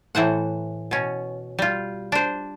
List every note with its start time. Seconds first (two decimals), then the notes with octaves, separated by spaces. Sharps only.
0.15 A2 E3 C5 F#5
0.91 B2 C#4
1.59 G3 F4
2.12 D4 C5